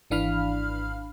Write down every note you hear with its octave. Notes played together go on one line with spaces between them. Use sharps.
G#1 E3 D4 F5 B5 F6